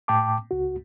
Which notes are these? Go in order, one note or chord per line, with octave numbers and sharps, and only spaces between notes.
A2 G5 A5 D6
C#2 F#4